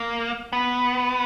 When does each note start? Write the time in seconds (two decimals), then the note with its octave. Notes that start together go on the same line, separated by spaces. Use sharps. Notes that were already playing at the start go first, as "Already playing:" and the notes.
Already playing: A#3
0.53 B3